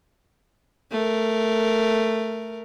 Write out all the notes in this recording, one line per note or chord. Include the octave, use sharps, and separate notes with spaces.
A3 A#4